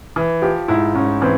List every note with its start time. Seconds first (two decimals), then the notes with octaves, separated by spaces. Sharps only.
0.16 E3
0.42 F3 G4
0.68 G#2 E4
0.95 G#2 C#4
1.22 E3 C4